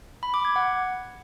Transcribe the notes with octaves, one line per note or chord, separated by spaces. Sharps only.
B5
D6
G#6
F#5